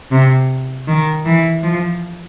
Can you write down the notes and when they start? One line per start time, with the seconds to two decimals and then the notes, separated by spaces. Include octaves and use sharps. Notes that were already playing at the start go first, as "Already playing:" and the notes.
0.12 C3
0.88 D#3
1.25 E3
1.63 F3